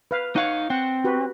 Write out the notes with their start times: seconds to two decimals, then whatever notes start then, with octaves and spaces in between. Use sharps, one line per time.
0.11 B4 F5
0.36 D#4 C#5 F5 F#5
0.70 C4 F#5
1.04 F#4 G4 B4